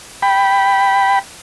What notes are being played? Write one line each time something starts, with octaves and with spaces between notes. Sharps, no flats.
G5 B5